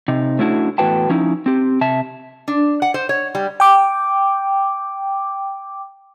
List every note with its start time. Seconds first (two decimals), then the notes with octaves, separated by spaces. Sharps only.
0.08 C3 D#4
0.39 A3 C#4 D4 E4 F#4
0.78 E2 A2 F#4 B4 G5 A5
1.09 F3 C#4 D#4 E4
1.46 C4 G4
1.81 C3 E5 A5
2.48 D4
2.82 F#5
2.94 C5
3.09 C#5
3.35 G3
3.60 G5 D6